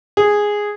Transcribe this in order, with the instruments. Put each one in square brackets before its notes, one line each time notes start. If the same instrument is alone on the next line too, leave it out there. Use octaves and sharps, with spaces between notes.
[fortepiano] G#4